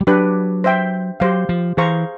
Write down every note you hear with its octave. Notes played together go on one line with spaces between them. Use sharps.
G3
F#3 D4 G4 B4
C5 E5 G5
F#3 G4 C5 F5
F3
E3 G#4 C5 F5 A#5 C#6